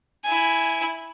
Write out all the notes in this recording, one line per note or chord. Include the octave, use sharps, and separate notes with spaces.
E4 G#5